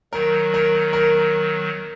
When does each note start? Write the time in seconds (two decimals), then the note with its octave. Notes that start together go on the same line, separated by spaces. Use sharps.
0.13 D#3 F#3 A#4
0.54 A#4
0.93 A#4